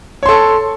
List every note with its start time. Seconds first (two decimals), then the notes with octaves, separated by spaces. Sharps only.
0.23 C#5
0.26 C6
0.29 A4